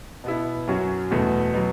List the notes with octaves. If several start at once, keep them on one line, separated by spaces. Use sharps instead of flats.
B2 B3 E4
F#2 F#3 C#4 F#4
E2 B2 A3 F#4
B2 F#3